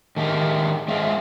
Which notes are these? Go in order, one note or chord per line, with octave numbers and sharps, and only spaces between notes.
D#3 G#3 A3 G4 A#4
G#3 C4 F4 E5